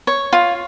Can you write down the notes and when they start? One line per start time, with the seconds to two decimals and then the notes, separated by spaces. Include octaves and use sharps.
0.07 C#5
0.33 F4